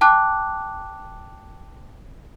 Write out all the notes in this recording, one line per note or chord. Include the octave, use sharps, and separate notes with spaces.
G5 A5 D6 F#6